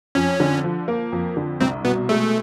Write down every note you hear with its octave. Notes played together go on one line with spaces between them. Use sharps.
F2 C#4
D3
F3
A#3
F2
D3
C2 C4
B2 B3
G#3 A3